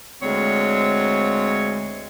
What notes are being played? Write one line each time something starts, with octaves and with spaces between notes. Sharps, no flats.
D2 G#3 C4 C#5